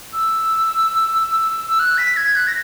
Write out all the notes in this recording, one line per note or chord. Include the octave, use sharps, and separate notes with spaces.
E6
E6
F#6
B6
G#6
F#6
A#6